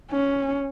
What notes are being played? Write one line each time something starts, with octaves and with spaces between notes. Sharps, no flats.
C#4